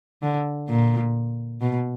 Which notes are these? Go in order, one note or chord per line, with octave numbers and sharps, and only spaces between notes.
D3
A#2
B2